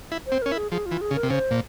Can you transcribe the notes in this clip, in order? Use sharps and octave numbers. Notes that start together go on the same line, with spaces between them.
E4
C5
C4
C#4 A#4
E4
G#4
F3 G#4
F4
E3
G#4
C#3
A#4
C3
C#3 C5
A#2